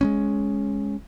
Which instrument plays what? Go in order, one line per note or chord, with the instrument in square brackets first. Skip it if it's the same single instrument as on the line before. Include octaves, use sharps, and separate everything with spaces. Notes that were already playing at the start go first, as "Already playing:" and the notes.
[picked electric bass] G#3 B3 C#4